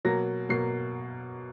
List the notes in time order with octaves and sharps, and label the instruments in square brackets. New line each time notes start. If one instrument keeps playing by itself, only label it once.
[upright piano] B2 F#3 A#3 A#6
B2 F#3 A#3 C7